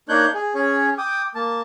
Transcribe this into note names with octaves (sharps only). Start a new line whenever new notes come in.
A#3 D4 D#4 C#5 F#6 G6
G#4
C#4 G#4 C#5
G5 D6 D#6
A#3 A5